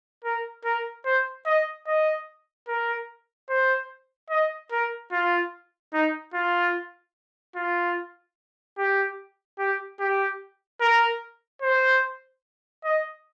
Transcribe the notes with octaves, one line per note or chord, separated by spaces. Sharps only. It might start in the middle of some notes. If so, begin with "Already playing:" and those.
A#4
A#4
C5
D#5
D#5
A#4
C5
D#5
A#4
F4
D#4
F4
F4
G4
G4
G4
A#4
C5
D#5